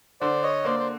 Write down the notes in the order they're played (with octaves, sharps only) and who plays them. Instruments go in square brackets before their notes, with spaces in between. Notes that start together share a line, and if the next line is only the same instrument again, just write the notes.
[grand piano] D3 [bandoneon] C5 D5
[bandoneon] C#5 D#5
[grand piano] A#3 [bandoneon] C5 D5
[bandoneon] C5